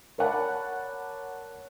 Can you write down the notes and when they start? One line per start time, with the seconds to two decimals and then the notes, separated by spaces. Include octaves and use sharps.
0.18 A#4 C#5 D5 F#5 A5 B5